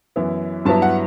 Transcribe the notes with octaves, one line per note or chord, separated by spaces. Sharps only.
F#2 E3 B3 E4
G2 F#3 B3 E4 A5
F#5